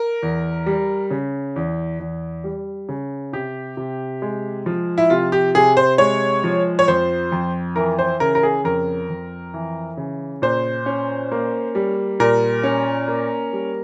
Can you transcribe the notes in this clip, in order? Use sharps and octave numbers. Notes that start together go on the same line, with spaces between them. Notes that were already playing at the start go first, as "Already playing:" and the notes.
Already playing: A#4
E2
G3
C#3
E2
E2
G3
C#3
C3 G4
C3
G#3
F3
E4
C3 F4
G4
C3 G#4
C5
G#3 C#5
F3
C#5
F2 C5
F2
E3 A#4
C5
C#3 A#4
A#4
G#4
F2 A#4
F2
E3
C#3
A#2 C5
C#4
A#3
G3
A#2 A#4
C#4
A#3
G3